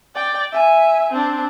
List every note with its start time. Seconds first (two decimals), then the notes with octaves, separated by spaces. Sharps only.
0.15 D5 G5
0.52 E5 G#5
1.12 C4 D4